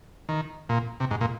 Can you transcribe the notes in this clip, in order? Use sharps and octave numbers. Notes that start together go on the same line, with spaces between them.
D#3
A#2
C3
G#2
A#2